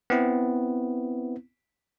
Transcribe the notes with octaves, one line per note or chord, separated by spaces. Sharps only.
B3 C4 E4